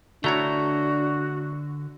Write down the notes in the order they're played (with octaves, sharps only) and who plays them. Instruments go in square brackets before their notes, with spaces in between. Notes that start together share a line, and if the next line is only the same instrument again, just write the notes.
[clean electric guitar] D3 A#5 [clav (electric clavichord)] A3 E4 C#5 [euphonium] D4 [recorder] F#4